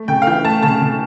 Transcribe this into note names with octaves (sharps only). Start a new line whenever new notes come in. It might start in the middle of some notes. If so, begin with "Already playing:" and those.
Already playing: A3
C#3 G5
F5
E3 G5
A3 A5
C#3 A5
C#3